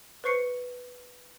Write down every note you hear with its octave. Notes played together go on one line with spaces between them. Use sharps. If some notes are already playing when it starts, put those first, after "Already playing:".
B4 C5 C#6 C7 C#7